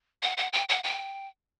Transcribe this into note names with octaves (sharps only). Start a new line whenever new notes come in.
F#5
F#5
G5
F#5
G5